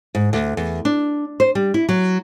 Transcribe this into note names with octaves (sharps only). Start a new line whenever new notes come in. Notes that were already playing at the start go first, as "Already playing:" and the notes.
G#2
D2
E2
D4
C5
G3
E4
F#3